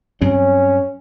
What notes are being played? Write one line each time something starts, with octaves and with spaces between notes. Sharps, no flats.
G2 F#3 C4 C#4